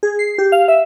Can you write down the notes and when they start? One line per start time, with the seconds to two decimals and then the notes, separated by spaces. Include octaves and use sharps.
0.03 G#4
0.19 C7
0.38 G4
0.52 F5
0.68 E5